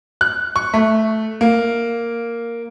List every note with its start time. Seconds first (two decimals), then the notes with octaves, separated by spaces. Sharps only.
0.21 F#6
0.56 C#6
0.74 A3
1.41 A#3